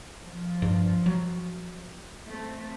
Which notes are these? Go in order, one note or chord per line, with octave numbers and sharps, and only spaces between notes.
F3
G2
F#3
A3 C4